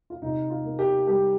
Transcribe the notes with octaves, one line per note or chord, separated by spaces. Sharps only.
F4
C3 D#4
F4
A#3
G4
G3 G4